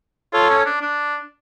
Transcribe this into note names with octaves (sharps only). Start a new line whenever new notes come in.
F4 A4 C#5
C#4
D4
D4